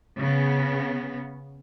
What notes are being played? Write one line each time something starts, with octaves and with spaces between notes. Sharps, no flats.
C#3 B3